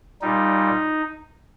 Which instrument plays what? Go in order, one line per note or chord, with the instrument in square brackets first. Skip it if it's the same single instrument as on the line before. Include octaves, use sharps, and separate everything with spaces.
[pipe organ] A#2 G3 D#4